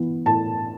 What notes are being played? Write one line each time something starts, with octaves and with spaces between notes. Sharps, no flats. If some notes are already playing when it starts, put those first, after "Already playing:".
Already playing: E3 B3
A2 A5